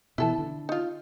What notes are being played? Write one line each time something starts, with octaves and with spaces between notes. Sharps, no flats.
B2 E3 E4 A4 A5
D3
D#4 F4